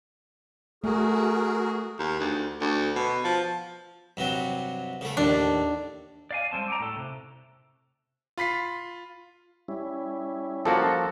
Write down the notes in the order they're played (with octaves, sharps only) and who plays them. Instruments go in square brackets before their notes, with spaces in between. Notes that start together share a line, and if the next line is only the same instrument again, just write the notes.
[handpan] A3 [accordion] F#4 G#4 A#4
[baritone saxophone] D#2
D2
D2
B2
F3
[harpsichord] G2 C3 F#3
C#3 A3
[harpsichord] D#2 A2 [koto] D4
[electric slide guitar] D5 F5 G#5
G3 G#3 C4 A5
D5 G5 A#5
A2 A4
C3
[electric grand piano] F4 B5 B6 C7
[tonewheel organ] G3 C#4 E4
[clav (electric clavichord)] F3 A#3 F#4 [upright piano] A4